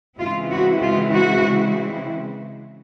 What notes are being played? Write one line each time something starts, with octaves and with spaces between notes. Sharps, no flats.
C#3 E3 G#3 C4 E4 F4
F#4
F4
F#4